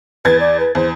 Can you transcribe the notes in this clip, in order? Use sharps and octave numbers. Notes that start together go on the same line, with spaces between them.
E2 B4 G#6 A6
D5
B4
E2 C5